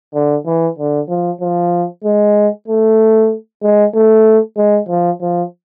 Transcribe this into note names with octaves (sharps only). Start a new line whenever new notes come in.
D3
E3
D3
F3
F3
G#3
A3
G#3
A3
G#3
F3
F3